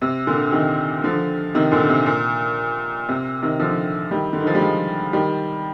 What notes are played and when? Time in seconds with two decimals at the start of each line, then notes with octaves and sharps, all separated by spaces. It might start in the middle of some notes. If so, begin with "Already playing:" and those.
0.01 C3
0.27 A#2 D3
0.52 C3 D#3
1.04 D3 F3
1.55 C3 D#3
1.71 A#2 D3
1.89 C3
2.06 A#2
3.09 C3
3.42 C3 D#3
3.59 D3 F3
4.11 D#3 G3
4.33 D3
4.40 D#3
4.47 F3
4.55 G3
4.61 F3 G#3
5.13 D#3 G3